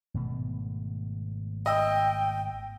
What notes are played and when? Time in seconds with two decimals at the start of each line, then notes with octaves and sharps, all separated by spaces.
0.14 G#1 B2 A3
1.66 D#5 G5 E6